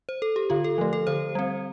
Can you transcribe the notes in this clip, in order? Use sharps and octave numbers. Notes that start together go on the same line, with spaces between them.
C5
A4
G4
D3 F4
A4
F3 A3
A4
D3 C5
G3 C4